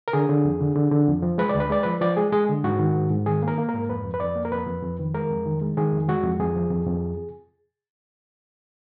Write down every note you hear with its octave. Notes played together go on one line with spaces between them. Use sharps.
A#4
D3 G#4
D3
F2
D3
D3
D3
F2
F3
G#3 B4
D5
D2
B4
G#3 D5
F3 B4
F3 D5
G#3 G#4
G#3 G#4
D3
G#2 F#4
D#3
G#2
G#2
D#3 G#4
A#3
A#4
A#3
A#4
G#2
F2 B4
F2
B4
F2 D5
A#3
A#4
F2 B4
F2
F2
D#3
G#3 A#4
F2
D#3
G#3
D#3 G#4
F2
G#3 F#4
F2
F2 G#4
F3
F2
F2